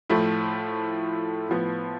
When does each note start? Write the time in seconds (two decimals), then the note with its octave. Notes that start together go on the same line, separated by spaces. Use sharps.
0.09 A2 F3 A3 E4
1.49 A2 F3 B3